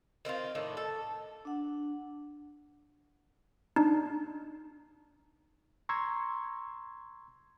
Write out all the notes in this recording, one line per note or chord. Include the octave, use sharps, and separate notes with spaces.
D#3 C4 D#4 F4
A2 D#3 D4
A4
D4 F#5
D4 D#4
A#5 C6 C#6 E6 G#6